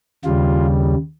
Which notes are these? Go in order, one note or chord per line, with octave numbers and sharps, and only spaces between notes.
D#2 C#3 G3 F4